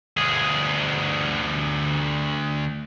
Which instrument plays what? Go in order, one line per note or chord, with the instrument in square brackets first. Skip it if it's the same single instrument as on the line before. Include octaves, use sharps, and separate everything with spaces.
[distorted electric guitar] D2 G#4